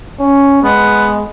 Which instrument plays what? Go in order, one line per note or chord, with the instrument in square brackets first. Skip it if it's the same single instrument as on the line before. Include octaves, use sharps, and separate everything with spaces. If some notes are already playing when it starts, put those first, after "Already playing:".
[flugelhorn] C#4
[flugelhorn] G#3 [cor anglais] B3